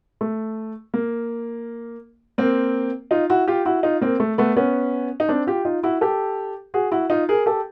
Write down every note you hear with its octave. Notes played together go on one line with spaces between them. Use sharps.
A3
A#3
A#3 C4
D#4 F4
E4 F#4
F4 G4
E4 F#4
D#4 F4
A#3 C4
A3
A3 B3
B3 C#4
D#4
C4 D4
F4 G4
D#4 F4
E4 F#4
G4 A4
F#4 G#4
E4 F#4
D#4 F4
G#4 A#4
G4 A4